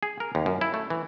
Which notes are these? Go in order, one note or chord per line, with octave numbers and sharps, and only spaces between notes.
G#4
A#4
D#2
F#2
E4
A3
E3